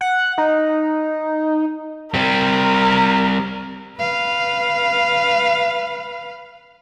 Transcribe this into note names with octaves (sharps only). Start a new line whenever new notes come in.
F#5
D#4
G3 C4 A#4
B4 F5